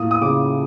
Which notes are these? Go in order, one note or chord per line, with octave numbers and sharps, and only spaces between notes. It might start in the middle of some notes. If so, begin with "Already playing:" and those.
Already playing: A2 A#3 D#6
D#6
C#3 D6